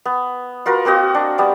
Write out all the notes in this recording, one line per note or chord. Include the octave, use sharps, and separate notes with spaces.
B3
F4 F#4 A#4 B4
A#3 C4 F#4 D#5
D4
G3 B3 D4